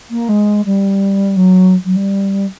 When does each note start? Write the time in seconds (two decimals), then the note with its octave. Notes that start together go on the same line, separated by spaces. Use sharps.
0.10 A#3
0.28 G#3
0.65 G3
1.36 F#3
1.85 F#3
1.96 G3